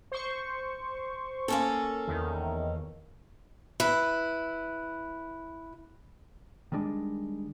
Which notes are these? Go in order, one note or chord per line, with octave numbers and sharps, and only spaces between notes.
C5 C#6
A#3 C#4 A4
E2 D#3
E4 B4
D#3 G3 G#3 D4